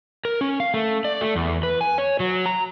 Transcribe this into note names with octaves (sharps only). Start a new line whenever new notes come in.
A#4
C#4
F5
A3
D5
A3
E2
B4
G#5
C#5
F#3
A#5